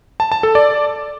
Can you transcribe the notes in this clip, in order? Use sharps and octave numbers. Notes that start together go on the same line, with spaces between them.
A5
A5
A4
D5